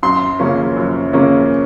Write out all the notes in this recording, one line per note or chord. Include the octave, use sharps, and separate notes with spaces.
F#2 C6
C#3 F3 A#3 C#4
F#2
C#3 F3 A#3 C#4